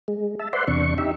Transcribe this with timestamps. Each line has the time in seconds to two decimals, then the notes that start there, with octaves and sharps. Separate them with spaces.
0.08 G#3
0.39 E5 A5
0.53 B4 C5 D5 E5 F#5 C6
0.68 E2 C3 D4 C#6
0.98 D#4 G4 E5